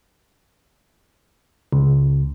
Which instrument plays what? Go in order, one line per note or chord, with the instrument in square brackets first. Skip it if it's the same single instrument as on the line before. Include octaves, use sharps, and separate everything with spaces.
[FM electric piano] C#2